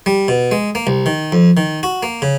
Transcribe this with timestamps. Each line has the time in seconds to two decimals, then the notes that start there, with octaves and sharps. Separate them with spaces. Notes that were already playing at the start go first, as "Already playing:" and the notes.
0.06 G3
0.28 B2
0.51 G#3
0.75 A#3
0.87 C2
1.06 D#3
1.32 F2
1.57 D#3
1.83 F#4
2.03 A#3
2.22 C#3